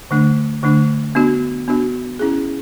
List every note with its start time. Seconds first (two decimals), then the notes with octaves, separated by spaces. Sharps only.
0.11 D3 A3 D4
0.63 D3 A3 D4
1.15 B3 D4 F#4
1.68 B3 D4 F#4
2.19 C#4 E4 G#4